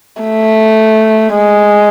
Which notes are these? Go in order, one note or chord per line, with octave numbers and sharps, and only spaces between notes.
A3
G#3